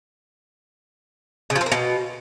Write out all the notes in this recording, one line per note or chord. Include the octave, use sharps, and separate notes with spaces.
C#3
F3
C4
A#3
B2